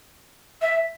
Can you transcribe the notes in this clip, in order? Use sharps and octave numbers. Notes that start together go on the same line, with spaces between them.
E5